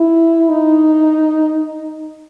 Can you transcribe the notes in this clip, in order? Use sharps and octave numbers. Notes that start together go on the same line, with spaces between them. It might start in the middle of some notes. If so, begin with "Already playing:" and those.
Already playing: E4
D#4